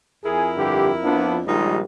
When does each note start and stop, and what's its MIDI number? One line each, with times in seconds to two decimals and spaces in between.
0.25 1.41 41
0.25 1.41 64
0.25 0.51 68
0.25 1.41 70
0.57 0.90 43
0.57 0.90 50
0.57 0.90 67
1.04 1.39 53
1.04 1.39 59
1.04 1.39 62
1.46 1.83 34
1.46 1.83 51
1.46 1.83 55
1.46 1.77 56
1.46 1.77 63
1.46 1.77 65